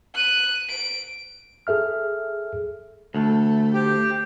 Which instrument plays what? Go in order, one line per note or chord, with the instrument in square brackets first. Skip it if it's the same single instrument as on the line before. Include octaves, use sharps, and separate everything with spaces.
[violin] F#6 D#7
D7
[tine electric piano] G#4 A4 E5 F6
[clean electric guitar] D2 [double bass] A3
[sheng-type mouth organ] G4 [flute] C5